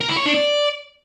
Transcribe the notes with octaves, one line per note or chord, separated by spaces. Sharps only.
A#4
E4
C#5
D4
D5